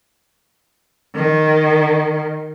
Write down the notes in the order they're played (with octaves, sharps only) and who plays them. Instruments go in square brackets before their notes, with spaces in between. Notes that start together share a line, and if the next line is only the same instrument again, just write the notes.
[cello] D#3